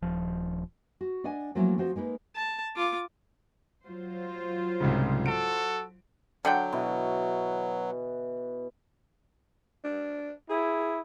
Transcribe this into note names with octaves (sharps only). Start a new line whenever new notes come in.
D#1 F3
F#4
D4 D5 D#5 F#5 G#5
F3 F#3 A3 A#3 C#4 E4
F3 C4 F#4 C5
G#3 A#3 D#4 B4
A5
F4 D6
F#3 F4 C5
C2 G#2 C#3
F#4 A4 D7
D3 F#3 F#5 G5
B2 E3 B4
D4
E4 G#4